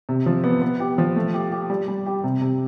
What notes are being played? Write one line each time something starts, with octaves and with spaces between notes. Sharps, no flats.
C3
F3
B3
B3
G4
F3
A3
G4
G4
G3
G3
G4
C3
C3